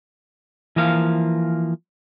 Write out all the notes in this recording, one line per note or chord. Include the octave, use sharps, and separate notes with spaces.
E3 F3 A#3 F5